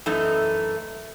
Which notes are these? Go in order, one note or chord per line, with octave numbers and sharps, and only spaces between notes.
F#2 E3 A3 D#4